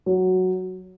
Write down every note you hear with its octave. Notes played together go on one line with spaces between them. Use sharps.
F#3